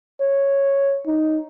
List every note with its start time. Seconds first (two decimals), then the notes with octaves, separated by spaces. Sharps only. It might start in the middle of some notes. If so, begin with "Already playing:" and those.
0.21 C#5
1.07 D#4